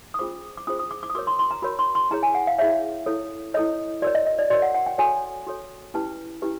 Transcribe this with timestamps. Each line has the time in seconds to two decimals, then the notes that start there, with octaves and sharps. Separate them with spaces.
0.14 D#6
0.19 C#4 F4 G#4 C5 D6
0.57 D6
0.67 C#4 F4 G#4 C5 D#6
0.79 D#6
0.91 D6
1.03 D6
1.10 D#6
1.15 F#4 A#4 C#5 D6
1.27 C6
1.39 C6
1.51 A#5
1.62 F#4 A#4 C#5 B5
1.79 C6
1.95 C6
2.11 E4 G#4 C#5 A#5
2.23 G#5
2.35 F#5
2.47 F5
2.58 E4 G#4 C#5 E5
3.06 E4 A4 C#5
3.54 E4 A4 C#5 D#5
4.02 F#4 A#4 C#5 D5
4.15 D#5
4.27 D#5
4.39 D5
4.50 F#4 A#4 C#5 D5
4.62 F#5
4.74 F#5
4.86 G5
4.98 F#4 A4 C#5 G#5
5.47 F#4 A4 C#5
5.94 C#4 E4 G4 B4 A5
6.42 C#4 E4 G4 B4